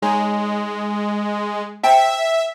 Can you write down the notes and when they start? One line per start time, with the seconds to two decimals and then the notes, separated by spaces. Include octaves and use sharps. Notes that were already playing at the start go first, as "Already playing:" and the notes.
0.02 G#3 D#4 C#5 G#5
1.83 C5 E5 G5 A5